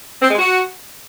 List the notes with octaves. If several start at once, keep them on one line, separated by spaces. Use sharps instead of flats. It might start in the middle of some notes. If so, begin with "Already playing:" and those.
C4
G#3
F#4